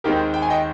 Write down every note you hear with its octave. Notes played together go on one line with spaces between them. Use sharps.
D#2 D#3 G#3 C4 G4 A#4
G5
G#5
D#5 G5